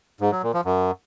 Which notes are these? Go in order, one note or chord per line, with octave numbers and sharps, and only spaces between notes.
G#2
F#3
A#2
F3
F#2